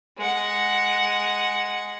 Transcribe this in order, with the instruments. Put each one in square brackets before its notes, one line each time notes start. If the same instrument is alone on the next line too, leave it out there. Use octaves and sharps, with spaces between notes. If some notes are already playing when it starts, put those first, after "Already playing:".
[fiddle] G#3 F#5